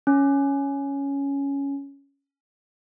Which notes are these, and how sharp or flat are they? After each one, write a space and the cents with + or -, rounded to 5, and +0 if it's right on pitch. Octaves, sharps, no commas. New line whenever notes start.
C#4 +5